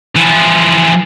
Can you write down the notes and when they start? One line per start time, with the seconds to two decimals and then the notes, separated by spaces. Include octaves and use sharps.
0.16 E3 F3